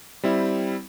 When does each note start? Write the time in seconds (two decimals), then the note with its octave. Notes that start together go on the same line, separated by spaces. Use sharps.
0.23 G3 C4 E4